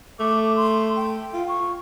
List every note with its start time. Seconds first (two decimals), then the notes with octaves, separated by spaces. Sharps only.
0.20 A3 D6
0.56 C6
0.96 G5
1.33 F4
1.48 C#6